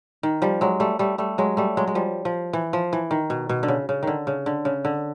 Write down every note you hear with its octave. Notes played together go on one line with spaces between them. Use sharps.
D#3
F3 G3
F#3 G#3
G3 A3
G3 A3
G3 A3
F#3 G#3
G3 A3
F#3 G#3
G#3
F3 G3
F3
E3
F3
E3
D#3
B2
B2
D3
C#3
C#3
D3 D#3
C#3
D3
C#3
D3